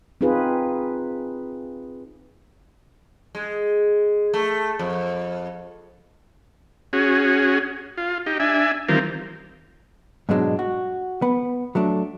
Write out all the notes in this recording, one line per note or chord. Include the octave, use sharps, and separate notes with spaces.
C4 D#4 F4 G#4 B4
G#3
A3
F2
C#4 F#4 G#4
F4
D#4 G4
D4 E5 G#5
D#3 E3 G3 C4 F4 A#4
G#2 B2 F#3 G#3 D4
F#4
B3
F#3 A3 D4